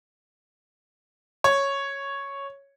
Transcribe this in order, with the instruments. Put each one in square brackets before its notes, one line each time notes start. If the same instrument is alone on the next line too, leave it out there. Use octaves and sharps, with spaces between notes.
[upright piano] C#5